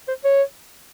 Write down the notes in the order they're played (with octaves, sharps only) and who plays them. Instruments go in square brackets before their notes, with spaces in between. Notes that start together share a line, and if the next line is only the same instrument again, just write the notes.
[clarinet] C5
C#5